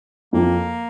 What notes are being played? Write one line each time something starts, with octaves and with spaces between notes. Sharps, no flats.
F2 A#3